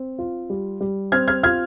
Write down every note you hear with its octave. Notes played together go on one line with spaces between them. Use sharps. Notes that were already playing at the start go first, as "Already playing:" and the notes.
Already playing: C4
F4
G3
G3
C4 F6 G#6
F6 G#6
F4 F6 G#6